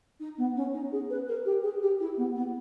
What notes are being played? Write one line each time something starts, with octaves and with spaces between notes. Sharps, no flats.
D#4
B3
C#4
D#4
G#4
B4
A#4
G4
G#4
G4
E4
B3
B3